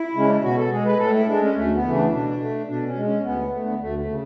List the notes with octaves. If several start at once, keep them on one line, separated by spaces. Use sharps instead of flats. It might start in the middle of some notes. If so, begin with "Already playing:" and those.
Already playing: E4
C#3 G#3 C#4
D4
E4
B2 F#4
A4
G#3 G#4
B4
A2 A4
E4
G#3 D4
C#4
D2 A3
B3
C#3 E3 A3
D4
B2 D4
A3
B2 D4
C#4
G#3
C#4
D2 B3
D3 A3
D2 A3
A3
C#3